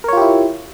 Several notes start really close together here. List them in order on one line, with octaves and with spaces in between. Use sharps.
A#4 C#5 F4 G4 E4